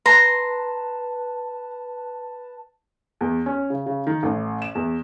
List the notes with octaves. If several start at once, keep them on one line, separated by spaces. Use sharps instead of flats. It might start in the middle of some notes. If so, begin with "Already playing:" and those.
B4 A5 A#5 C6
E2
C#4
C#3
C#3
D#3
A1
E7
E2